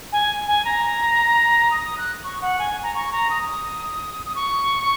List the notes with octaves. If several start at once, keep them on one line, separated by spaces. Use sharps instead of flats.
G#5
G#5
A#5
D#6
D#6
F#6
C#6
F#5
G#5
A#5
C#6
A#5
D#6
D#6
C#6